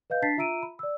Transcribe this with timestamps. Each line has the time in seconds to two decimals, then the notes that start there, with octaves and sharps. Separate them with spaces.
0.10 B4 D#5 F5 G6
0.22 D4 A5 A6 B6 C7
0.37 F4 E5 A#5 E6 D7 D#7
0.63 B5
0.79 D5 E6